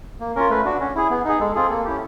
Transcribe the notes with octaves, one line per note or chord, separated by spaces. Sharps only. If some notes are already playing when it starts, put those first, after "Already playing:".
A#3
C#4 F4 A#4
A3 B4
D4 F#4
C#4
E4 G#4
B3
D#4 G#4
G#3 A4
C4 F4 G#4
A#3
C#4 E4 G4